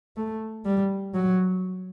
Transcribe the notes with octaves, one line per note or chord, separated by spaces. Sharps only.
A3
G3
F#3